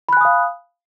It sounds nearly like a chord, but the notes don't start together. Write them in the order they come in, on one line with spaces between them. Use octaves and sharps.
B5 F#6 G#5 D#6 F5